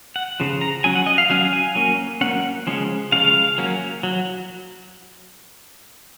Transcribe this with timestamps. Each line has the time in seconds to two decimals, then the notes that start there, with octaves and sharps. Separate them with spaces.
0.16 F#5
0.40 C#3 F3
0.61 A#5
0.84 F#3 C#4 G#5
0.95 F#5
1.07 D#5
1.18 F5
1.30 F#3 C#4 F5
1.53 G#5
1.75 F#3 A#3 C#4
2.21 F#3 A#3 C#4 F#5
2.67 C#3 F3 G#3 C#4
3.12 C#3 F3 G#3 C#4 F5
3.58 F#3 A#3 C#4
4.03 F#3